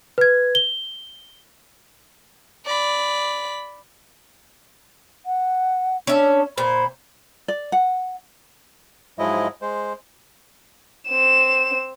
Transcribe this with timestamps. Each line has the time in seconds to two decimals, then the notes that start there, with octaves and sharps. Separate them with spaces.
0.18 B4 G#6
0.55 G7
2.66 D5 B5
5.26 F#5
6.07 C#4 D4 E5
6.58 A#2 C5 B5
7.48 D5
7.72 F#5
9.19 G#2 F3 F#3 G#3 E4 D#5
9.62 G#3 C5
11.09 C4 E7